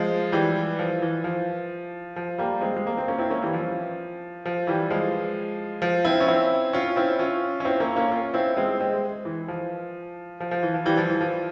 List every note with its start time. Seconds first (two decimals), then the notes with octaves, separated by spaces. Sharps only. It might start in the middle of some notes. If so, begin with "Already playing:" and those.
Already playing: F3 G#3
0.32 E3 G3
0.79 F3
1.02 E3
1.24 F3
2.16 F3
2.38 G3 A#3
2.61 G#3 C4
2.77 G#3
2.87 A#3
2.97 C4
3.08 A#3 C#4
3.18 C4 E4
3.30 A#3 C#4
3.42 E3 G3
3.53 F3
4.46 F3
4.67 E3 G3
4.90 F3 G#3
5.82 F3
6.05 C4 E4
6.21 C#4
6.28 C4 E4
6.73 C#4 F4
6.96 C4 E4
7.19 C#4 F4
7.60 C#4
7.65 C4 E4
7.80 A#3 C#4
7.96 A#3 C#4
8.11 C#4 F4
8.34 C4 E4
8.57 G#3 C4
8.80 G#3 C4
9.25 E3
9.48 F3
10.40 F3
10.51 F3
10.63 E3
10.74 F3
10.85 E3 G3
10.98 F3
11.09 E3
11.21 F3